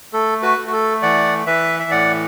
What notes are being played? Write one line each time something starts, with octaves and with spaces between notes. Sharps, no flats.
A3 A4
F#4 B4
A3
F#4
A4
E3 D5 F#5
E3 B4 E5
E5
A2 D5 F#5